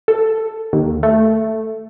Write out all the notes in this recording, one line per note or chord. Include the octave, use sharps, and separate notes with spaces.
A4
D#2
A3